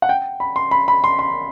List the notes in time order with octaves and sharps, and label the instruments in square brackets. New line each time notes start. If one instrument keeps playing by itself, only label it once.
[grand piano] F#5
G5
B5
C6
B5
B5
C6
C6